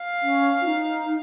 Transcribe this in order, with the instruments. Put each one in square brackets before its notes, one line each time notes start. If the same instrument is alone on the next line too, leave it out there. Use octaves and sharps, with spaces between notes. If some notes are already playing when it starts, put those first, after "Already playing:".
Already playing: [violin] F5
[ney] C#4
F4
D#4